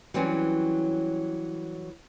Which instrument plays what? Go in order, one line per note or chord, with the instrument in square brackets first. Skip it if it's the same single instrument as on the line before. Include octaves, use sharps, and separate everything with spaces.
[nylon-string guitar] E3 F#3 G3 C4 C#4